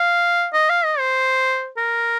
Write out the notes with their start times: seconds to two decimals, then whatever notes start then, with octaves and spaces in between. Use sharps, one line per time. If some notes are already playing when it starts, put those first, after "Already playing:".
Already playing: F5
0.53 D#5
0.69 F5
0.85 D#5
0.99 C5
1.77 A#4